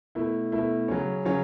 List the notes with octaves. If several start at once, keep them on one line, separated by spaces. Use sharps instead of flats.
B2 A3 E4
B2 A3 E4
C#3 F#3 C#4
C#3 F#3 C#4